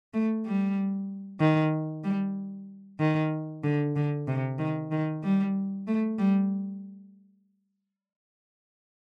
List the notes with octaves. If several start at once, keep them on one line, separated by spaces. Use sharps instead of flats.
A3
G3
D#3
G3
D#3
D3
D3
C3
D#3
D#3
G3
A3
G3